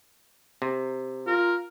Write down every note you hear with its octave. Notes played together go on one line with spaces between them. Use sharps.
C3
F4 A#4